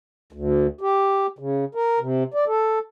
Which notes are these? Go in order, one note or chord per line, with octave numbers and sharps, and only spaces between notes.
D2
G4
C#3
A#4
C3
D5
A4